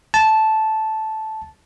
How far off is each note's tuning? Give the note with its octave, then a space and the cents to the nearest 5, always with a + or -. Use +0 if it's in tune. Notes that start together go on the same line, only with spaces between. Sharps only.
A5 -10